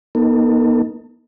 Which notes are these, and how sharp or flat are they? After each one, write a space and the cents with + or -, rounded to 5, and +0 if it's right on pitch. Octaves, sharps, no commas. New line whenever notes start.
B3 -45 D#4 +0 A4 +40